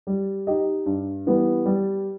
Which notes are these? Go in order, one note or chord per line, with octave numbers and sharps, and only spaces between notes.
G3
D#4 G4 D#5
G2
E3 G3 B3
G3